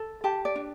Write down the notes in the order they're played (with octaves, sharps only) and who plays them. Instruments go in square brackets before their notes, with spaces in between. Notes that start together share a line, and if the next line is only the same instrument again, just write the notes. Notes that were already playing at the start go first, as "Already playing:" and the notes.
Already playing: [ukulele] A4
G4 A5
D5
D4